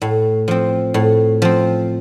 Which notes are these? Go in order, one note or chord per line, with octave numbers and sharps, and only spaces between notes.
A2
F3 C4
A2
F3 C4